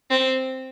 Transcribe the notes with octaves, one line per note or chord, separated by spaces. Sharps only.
C4